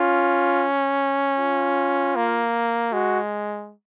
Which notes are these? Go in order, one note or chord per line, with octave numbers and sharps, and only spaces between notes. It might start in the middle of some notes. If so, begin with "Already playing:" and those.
Already playing: C#4 F4
F4
A#3
G#3 F#4